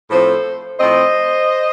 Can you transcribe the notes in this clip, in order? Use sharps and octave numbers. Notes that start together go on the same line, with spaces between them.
A2 F3 C4 A4 C5
A2 F3 C4 C5 D#5